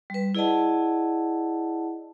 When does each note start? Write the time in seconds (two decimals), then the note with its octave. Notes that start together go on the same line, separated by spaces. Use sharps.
0.10 G3 B4
0.35 E4 G#4 D5 D#5 F#5 A5